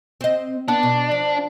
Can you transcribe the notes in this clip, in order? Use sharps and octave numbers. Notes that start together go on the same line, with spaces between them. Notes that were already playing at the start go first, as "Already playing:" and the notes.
C4 D#5
B3 D4
B2
F3